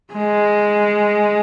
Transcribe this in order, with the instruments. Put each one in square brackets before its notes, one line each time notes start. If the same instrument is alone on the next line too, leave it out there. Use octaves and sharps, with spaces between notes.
[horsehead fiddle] G#3